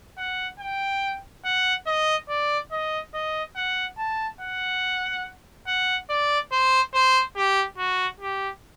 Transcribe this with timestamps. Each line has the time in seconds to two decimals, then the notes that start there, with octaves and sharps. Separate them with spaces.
0.18 F#5
0.60 G5
1.45 F#5
1.87 D#5
2.29 D5
2.71 D#5
3.14 D#5
3.56 F#5
3.98 A5
4.41 F#5
5.67 F#5
6.10 D5
6.52 C5
6.94 C5
7.36 G4
7.78 F#4
8.20 G4